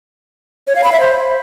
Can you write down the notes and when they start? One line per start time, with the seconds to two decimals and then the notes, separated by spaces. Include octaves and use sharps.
0.67 C#5
0.75 F5
0.84 B5
0.92 E5
1.00 C5